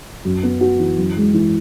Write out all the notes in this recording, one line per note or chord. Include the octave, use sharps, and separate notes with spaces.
F#2
B3
F#4
E3
F#2
G#3
E3